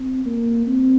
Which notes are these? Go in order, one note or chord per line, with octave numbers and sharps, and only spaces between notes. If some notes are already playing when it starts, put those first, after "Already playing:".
Already playing: C4
A#3
C4